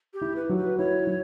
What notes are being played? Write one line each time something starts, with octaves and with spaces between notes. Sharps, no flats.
G4
E4
B4
F#3
B4
E4 C#5
F#3